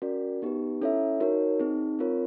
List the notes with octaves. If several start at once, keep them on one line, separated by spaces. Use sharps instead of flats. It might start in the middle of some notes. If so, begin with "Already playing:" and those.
C#4 F#4 A#4 D5
B3 D#4 G4 B4
C#4 E4 A4 C#5 E5
D#4 F#4 A#4 C#5
C4 D#4 G#4
C4 F4 A#4 C#5